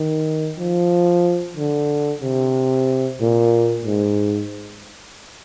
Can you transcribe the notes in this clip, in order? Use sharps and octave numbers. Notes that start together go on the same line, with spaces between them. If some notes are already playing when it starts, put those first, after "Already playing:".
Already playing: D#3
F3
D3
C3
A#2
G#2